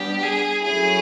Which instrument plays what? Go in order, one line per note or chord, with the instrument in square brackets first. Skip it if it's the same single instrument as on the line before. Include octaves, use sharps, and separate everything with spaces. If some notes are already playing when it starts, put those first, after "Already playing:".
Already playing: [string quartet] G3 B3 D4 [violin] G4
[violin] G#4
[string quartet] F#3 A3 C#4 E4 [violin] G#4